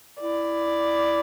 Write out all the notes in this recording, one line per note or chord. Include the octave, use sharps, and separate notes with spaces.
E4 D5